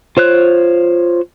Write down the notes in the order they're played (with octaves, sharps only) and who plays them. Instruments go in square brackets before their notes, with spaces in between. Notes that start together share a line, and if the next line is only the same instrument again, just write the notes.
[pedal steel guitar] F4 C5 C#5 F#6